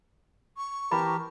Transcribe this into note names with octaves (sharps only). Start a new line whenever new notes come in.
C#6
E3 G4 A#4 A5 B5